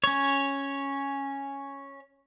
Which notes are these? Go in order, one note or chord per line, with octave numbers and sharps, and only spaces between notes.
C#4 C#5